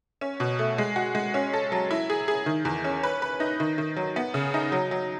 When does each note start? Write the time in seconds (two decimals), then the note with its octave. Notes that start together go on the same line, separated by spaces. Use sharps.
0.21 C#4
0.40 B2
0.59 A3
0.78 G#3
0.96 F#4
1.15 G#3
1.34 C#4
1.53 A4
1.72 F#3
1.91 E4
2.10 G#4
2.28 G#4
2.46 D#3
2.65 E2
2.84 C#4
3.03 B4
3.22 B4
3.40 D#4
3.60 D#3
3.78 D#3
3.96 F#3
4.16 B3
4.34 C#3
4.54 D#4
4.72 F#3
4.91 F#3